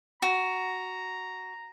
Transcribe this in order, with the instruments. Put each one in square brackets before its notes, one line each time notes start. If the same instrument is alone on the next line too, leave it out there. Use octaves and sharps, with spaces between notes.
[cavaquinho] F#4 [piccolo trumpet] A#5